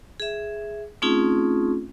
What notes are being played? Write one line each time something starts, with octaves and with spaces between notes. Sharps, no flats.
G#4 E5
A3 C4 C#4 D#4 F4 G#4